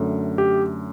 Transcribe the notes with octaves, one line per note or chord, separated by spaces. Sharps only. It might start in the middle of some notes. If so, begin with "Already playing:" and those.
Already playing: F#2 D3 A3
G4